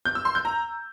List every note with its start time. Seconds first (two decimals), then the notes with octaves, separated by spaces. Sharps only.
0.05 G6
0.15 E6
0.25 C6
0.35 G6
0.45 A#5